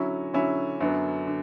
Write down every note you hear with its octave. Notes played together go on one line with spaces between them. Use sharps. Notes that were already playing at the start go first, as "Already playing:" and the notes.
Already playing: D3 F#3 C#4 E4
D3 F#3 C#4 E4
F#2 D3 F#3 B3
D3